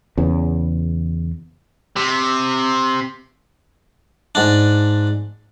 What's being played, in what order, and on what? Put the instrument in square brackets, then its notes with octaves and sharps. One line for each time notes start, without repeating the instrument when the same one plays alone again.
[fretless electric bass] E2 C#3 E3
[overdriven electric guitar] C3
[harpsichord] G#2 D4